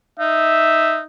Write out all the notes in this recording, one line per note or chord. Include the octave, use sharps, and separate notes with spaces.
D#4 E5